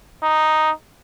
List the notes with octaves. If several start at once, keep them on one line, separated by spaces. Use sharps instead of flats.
D#4